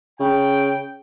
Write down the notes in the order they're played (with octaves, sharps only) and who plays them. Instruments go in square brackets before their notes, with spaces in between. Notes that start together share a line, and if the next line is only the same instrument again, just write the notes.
[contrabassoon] C#3 [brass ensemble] G5